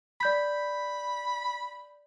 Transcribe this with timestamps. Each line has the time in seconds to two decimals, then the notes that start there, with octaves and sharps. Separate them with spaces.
0.21 D5 B5 G6 B6